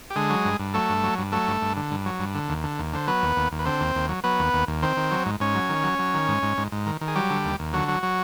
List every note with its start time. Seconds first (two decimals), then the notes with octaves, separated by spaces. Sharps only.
0.10 G4
0.16 D3 G#3 G#4
0.30 F#3
0.45 G2
0.59 G2
0.74 F#3 A3 A4
0.89 G2
1.04 F#3
1.18 G2
1.32 F#3 A3 A4
1.48 G2
1.62 G2
1.76 D3
1.91 G2
2.06 F#3
2.19 G2
2.35 D3
2.49 D#2
2.64 D3
2.79 D#2
2.93 D3 C5
3.07 F#3 B3 B4
3.22 D#2
3.36 D#2
3.52 D#2
3.59 B4
3.65 D3 C4 C5
3.81 D#2
3.95 D#2
4.09 F#3
4.24 F#3 B3 B4
4.39 D#2
4.53 D#2
4.67 D#2
4.82 D#3 C4 C5
4.97 D#3
5.11 F#3
5.26 G#2
5.40 G#2 C#4 C#5
5.55 F#3
5.69 D#3
5.84 F#3
5.99 F#3
6.14 D#3
6.28 G#2
6.43 G#2
6.57 G#2
6.72 G#2
6.86 D#3
7.01 D#3
7.08 G#4
7.15 F#3 G3 G4
7.30 D3
7.45 D#2
7.59 D#2
7.73 D3 F#3 F#4
7.88 F#3
8.03 F#3